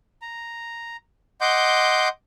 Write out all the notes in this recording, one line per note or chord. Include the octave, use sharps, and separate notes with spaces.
A#5
D#5 F#5 C6 D6 G6